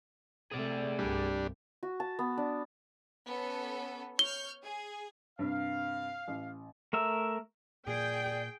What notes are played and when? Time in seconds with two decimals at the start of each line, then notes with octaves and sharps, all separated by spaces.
0.51 C3 A3 G#4 D5
0.99 C2 G2 G3 D4
1.83 F#4
2.00 A5
2.19 B3
2.38 D4
3.27 B3 C#4 A4
4.19 C#5 F6 G6 G7
4.63 G#4
5.39 G2 C3 F5
6.28 A1
6.93 A3 A#4 E5
7.87 A#2 G#4 D5 G5